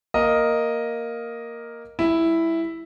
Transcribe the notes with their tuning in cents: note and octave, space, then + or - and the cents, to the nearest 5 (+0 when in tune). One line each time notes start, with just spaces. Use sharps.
A#3 +0 A#4 +0 D#5 +0
G3 +20 E4 +0